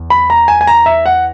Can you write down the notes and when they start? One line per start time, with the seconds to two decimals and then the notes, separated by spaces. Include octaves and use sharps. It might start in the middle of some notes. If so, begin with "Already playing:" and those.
Already playing: E2
0.10 B5
0.30 A#5
0.48 G#5
0.61 G#5
0.67 A#5
0.86 E5
1.06 F#5